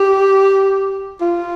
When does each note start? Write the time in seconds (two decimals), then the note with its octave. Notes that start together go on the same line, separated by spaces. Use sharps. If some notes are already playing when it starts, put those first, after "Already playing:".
Already playing: G4
1.21 F4